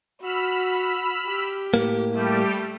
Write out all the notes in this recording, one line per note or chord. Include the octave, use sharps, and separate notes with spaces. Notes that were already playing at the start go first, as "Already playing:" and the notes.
F#4 B5 E6 F6
G4
A2 A#3
G3 A3 G4